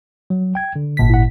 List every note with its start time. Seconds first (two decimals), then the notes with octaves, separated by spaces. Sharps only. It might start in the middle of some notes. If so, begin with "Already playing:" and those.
0.30 F#3
0.55 G5 G#6
0.76 D3
0.97 G#1 A#2 B6
1.10 E4 F#5